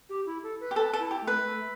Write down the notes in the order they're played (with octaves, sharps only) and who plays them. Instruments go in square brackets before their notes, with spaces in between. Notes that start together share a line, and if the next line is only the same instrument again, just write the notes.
[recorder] G4
E4
A4
B4
[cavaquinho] G4
[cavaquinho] A4 [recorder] B4
[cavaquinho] A4
[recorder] E4
[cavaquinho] G4
[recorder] A3
[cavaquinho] B4
[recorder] A3